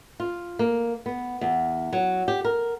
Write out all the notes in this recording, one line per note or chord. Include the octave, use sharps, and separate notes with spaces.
F4
A#3
B3
E2
F#3
G4
A#4